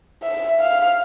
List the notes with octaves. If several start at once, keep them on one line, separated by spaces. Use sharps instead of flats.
E5
F5